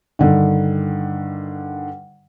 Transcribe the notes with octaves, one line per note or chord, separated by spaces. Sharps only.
G2 D3 D#3